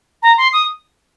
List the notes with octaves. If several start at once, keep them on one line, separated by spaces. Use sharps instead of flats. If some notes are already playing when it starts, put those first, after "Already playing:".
A#5
C6
D#6